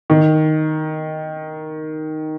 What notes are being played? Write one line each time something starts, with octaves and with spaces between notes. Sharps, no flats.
D#3